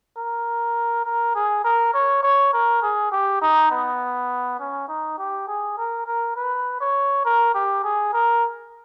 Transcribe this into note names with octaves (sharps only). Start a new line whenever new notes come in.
A#4
A#4
G#4
A#4
C#5
C#5
A#4
G#4
G4
D#4
B3
C#4
D#4
G4
G#4
A#4
A#4
B4
C#5
A#4
G4
G#4
A#4